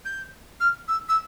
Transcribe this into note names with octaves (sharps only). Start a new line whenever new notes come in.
G6
F6
E6
E6